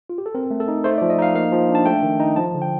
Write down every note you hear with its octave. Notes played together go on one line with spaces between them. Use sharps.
F4
G4
A4
C4 A#4
A3
A4
D#4
A3 C5
D5
F3
D#5
D#4 F5
A#3 F5
F3
D4
A5
A3 G5
D#3
D#4
F3 A5
D3
G5